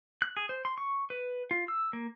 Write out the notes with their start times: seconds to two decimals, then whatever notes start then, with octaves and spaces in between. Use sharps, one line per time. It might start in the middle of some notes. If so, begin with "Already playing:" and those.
0.22 F#6
0.37 G#4
0.49 C5
0.65 C6
0.78 C#6
1.10 B4
1.51 F4
1.68 E6
1.93 A#3